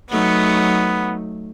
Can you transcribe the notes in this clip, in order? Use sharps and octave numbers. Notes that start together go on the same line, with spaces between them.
F#3 A3 B3 D#4